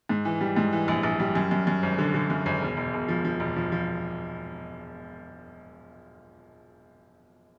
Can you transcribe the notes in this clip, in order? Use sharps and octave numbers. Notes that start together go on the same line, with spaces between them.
G#2
E3
G3
G#2
E3
A#1
A#1
G3
F#2
F#2
F#2
G#1
D3
D3
F#2
G#1
E1
E1
E1
F3
F3
E1
F3
F3